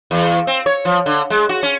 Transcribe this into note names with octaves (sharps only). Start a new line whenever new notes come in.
E2
C4
C#5
F3
D3
G#3
F#4
C#4